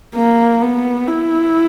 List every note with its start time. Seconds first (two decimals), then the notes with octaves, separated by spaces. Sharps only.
0.16 A#3
0.62 B3
1.08 E4